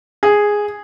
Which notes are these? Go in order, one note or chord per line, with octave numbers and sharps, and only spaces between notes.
G#4